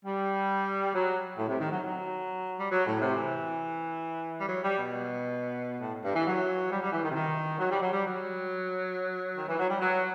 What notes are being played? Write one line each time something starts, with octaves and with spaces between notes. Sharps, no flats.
G3
F#3
A2
C3
D#3
F#3
F#3
G3
F#3
A2
C3
E3
G3
F#3
G3
B2
A2
G2
E3
F#3
G3
G3
E3
D#3
C3
D#3
F#3
G3
F#3
G3
F#3
D#3
E3
F#3
G3
F#3